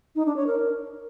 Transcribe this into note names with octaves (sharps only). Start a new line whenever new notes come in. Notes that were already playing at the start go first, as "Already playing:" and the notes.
D#4
D4
C#5
A#4